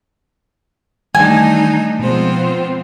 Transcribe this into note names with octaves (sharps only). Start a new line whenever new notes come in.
D#3 E3 G3 A3 D4 D#4 G#5
B2 F3 G#3 B3 C4 F4 C5